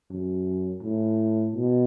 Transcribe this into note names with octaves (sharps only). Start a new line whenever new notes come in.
F#2
A2
B2